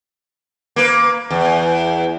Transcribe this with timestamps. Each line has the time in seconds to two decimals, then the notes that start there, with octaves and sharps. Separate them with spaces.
0.76 A#3 B4
1.30 E2